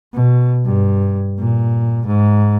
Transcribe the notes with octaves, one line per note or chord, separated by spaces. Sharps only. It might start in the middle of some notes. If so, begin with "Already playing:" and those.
B2
G2
A#2
G#2